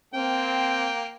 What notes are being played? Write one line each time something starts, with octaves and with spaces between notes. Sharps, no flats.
A#3 C4 G5